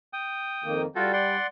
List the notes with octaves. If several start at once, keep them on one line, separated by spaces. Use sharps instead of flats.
G5 D#6
F2 D#3 A#3
G3 F4 F#4 A4 G5
D5 F#5 C6